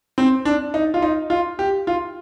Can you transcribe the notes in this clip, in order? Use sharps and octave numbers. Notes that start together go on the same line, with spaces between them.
C4
D4
D#4
F4
D#4
F4
G4
F4